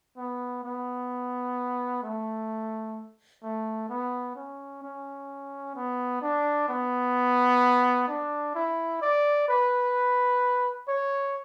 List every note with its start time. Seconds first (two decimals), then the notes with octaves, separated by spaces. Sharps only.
0.17 B3
0.64 B3
2.03 A3
3.43 A3
3.89 B3
4.36 C#4
4.82 C#4
5.75 B3
6.22 D4
6.69 B3
8.08 D4
8.55 E4
9.01 D5
9.48 B4
10.88 C#5